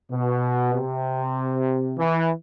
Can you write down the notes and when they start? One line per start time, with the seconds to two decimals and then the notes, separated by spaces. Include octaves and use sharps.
0.12 B2
0.73 C3
1.97 E3